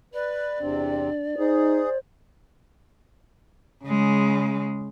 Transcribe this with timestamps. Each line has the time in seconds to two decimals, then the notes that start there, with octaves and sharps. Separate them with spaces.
0.14 B4 D5
0.59 E2 C3 C4 D4
1.38 D#4 G#4 C5
3.84 C#3 G#3